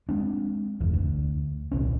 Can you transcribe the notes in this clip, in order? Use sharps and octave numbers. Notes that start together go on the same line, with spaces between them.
G#3 C4 D4
F#1 E2
D2
D#1 C2 C#4